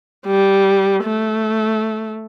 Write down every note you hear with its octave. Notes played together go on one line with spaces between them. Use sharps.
G3
A3